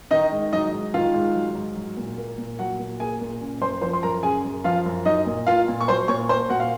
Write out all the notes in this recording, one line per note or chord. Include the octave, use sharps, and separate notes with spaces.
D#3 D#4 D#5
G#2
F#3 D#4 D#5
G#2
D#3 F4 F5
G#2
F#3
G#2
F#3
A#2
A#3
A#2
F#3 F#4 F#5
A#2
A#3 G#4 G#5
A#2
C#3
F#2 C5 C6
F3 C5 C6
C6
F#2 A#4 A#5
C#3 G#4 G#5
F#2
F3 F4 F5
F#2
F#3 D#4 D#5
A#2
A#3 F4 F5
A#2
C#6
F#3 C5 C6
A#2 C#5 C#6
A#3 C5 C6
A#2 F#4 F#5
F5